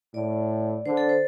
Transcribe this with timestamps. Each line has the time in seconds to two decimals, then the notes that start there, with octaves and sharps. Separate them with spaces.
0.14 A2 D5
0.86 D3 C5
0.97 A4
1.09 C5